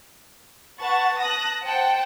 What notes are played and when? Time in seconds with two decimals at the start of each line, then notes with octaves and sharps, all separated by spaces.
0.80 B4 F#5 A5 C#6 A6
1.19 A5 D#6 F#6 A#6
1.63 C5 F#5 G5 A5